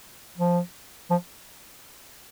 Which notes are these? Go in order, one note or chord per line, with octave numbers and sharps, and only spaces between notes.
F3
F3